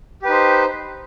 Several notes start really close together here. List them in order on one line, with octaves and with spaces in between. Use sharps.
G4 B4 D#4 C5